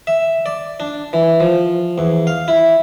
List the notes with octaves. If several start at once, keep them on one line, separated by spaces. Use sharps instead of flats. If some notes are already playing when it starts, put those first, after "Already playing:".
E5
D5
D4
E3
F3
E2
F5
E4